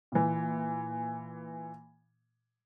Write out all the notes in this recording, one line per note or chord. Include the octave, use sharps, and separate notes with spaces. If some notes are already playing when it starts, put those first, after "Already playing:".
A#2 E3